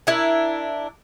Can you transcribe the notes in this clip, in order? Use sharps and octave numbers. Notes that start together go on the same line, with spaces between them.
D4 E4 A#4